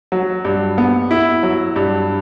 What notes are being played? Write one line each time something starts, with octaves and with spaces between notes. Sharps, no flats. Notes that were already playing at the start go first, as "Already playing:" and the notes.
F#3
G2
B3
E4
F#3
G2